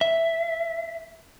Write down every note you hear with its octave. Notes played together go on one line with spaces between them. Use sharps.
E5